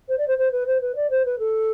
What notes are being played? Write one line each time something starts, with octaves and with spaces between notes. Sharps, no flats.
C5
D5
C5
C5
B4
C5
B4
D5
C5
B4
A4